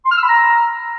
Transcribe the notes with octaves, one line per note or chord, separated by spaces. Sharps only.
C6
F6
E6
B5
A#5